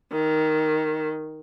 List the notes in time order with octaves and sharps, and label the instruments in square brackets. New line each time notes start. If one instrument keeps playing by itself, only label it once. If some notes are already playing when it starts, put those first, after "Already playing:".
[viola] D#3